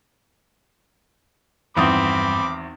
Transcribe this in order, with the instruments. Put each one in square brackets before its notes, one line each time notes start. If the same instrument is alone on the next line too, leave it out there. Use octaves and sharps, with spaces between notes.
[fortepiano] G#1 E2 D#6 [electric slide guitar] G2 F#5 [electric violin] C4 [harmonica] B5 D6